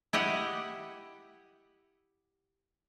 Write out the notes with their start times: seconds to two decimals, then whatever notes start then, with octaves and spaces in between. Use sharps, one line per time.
0.13 E4 G4 D#5 F#5